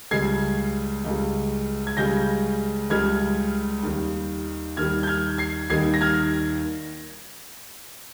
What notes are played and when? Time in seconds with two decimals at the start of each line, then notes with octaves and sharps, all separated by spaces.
0.11 C#2 C#3 G3 G#6 C7
1.04 C#2 C#3 G3
1.87 G#6
1.97 C#2 C#3 G3 G6 A#6
2.90 C#2 C#3 G3 F6 G#6
3.83 D#2 D#3 G3
4.77 D#2 D#3 G3 F6 G#6
5.03 G6
5.07 F6 G#6
5.38 G#6 C7
5.70 D#2 D#3 G3 G#6 C7
5.94 A#6
6.01 F6 G#6